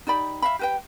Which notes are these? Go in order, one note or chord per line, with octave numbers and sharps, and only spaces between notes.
D#4 G4 D5 B5
E5 F5 B5
G4 B4 G5